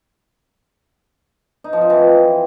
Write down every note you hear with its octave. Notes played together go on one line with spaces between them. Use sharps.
D#4
F3
C4
E3